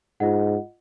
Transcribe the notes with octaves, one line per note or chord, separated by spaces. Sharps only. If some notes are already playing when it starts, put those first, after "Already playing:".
G#2 F4 D#5 F#5